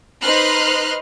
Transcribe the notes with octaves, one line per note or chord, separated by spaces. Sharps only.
D#4 B4 C5 C6 F6 F#6